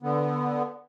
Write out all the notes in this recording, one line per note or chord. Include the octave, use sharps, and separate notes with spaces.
D3 B3